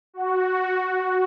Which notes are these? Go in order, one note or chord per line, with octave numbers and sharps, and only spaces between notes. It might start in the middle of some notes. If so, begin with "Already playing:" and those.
F#4